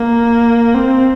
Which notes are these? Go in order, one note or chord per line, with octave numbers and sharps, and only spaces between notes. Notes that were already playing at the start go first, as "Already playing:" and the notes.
Already playing: A#3
C4